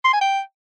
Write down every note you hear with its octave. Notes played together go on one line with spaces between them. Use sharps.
C6
G#5
G5